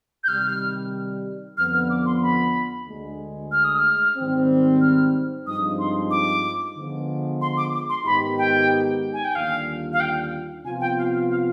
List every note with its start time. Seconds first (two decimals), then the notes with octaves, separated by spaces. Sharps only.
0.24 G6
0.28 C3 D#3 G3 F6
1.57 F2 D3 F3 B3 F6
1.73 F6
1.90 D6
2.06 C6
2.22 B5
2.87 D2 D3 G#3
3.52 F6
3.65 D#6
3.76 F6
4.17 G#2 D#3 G3 C4
4.82 F6
5.47 G2 F3 G#3 C4 D#4 D#6
5.79 C6
6.11 D6
6.76 D3 F3 G#3 B3
7.41 C6
7.57 D6
7.74 D6
7.89 C6
8.06 G#2 D#3 B3 D#4 G4 B5
8.38 G5
9.13 G#5
9.24 G5
9.35 D#2 D3 G3 D4 F4 F5
9.93 F5
10.00 G5
10.65 C3 F3 B3 F4 G#5
10.81 G5
10.97 F5
11.13 F5
11.30 F5